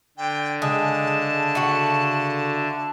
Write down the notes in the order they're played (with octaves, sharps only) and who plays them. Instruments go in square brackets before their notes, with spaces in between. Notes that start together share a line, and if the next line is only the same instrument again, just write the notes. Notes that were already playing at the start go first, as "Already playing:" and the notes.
[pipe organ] D3 [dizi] G5
[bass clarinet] C#3 [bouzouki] G#3 [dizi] A5
[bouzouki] A3 F#4